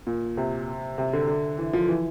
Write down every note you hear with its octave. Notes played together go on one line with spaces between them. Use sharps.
A#2
C3
C3
D3
D3
E3
F3
E3